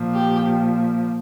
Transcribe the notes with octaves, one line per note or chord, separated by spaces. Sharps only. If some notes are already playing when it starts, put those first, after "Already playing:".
Already playing: A#2 F3
G4